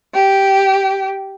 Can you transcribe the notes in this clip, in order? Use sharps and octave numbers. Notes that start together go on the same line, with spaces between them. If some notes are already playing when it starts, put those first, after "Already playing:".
G4